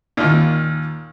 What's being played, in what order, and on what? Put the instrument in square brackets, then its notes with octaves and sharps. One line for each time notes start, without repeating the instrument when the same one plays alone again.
[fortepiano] D#2 A#2